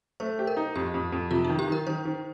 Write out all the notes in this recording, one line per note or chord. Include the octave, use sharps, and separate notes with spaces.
A3 C5
G4
A#4
D#4
F2 G4
F2
F2
C3 F4
D#4
D#3
G4
D#3 A#4
D#3 C5
D#3